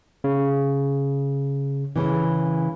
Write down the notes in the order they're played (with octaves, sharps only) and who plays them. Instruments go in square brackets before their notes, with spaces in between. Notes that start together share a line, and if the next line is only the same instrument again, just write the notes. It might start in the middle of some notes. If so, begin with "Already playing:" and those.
[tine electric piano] C#3
[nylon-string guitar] C#3 E3